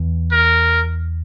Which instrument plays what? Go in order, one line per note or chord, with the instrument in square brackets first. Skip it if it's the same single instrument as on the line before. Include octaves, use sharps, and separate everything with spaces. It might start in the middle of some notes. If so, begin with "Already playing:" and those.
Already playing: [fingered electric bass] E2 E3
[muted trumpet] A#4